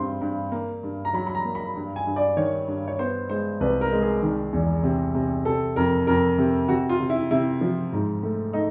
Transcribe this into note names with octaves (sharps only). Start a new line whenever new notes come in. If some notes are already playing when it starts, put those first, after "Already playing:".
Already playing: G2 G3 C4 C6
G2
A#3
G2
A#5
F#3 B5
B5
A#5
A#3
B5
G2
G#5
G2
D5
D#3 C#5
G2
C#5
B3 C5
G#3 C5
C2 B4
A#4
G#3
G#4
D#3
E2
C3
C3
C3 A4
F2 A#4
F2 A#4
C3
C3 F#4
F4
C3
E4
C3 E4
F3
G#2
A3
A3 D#4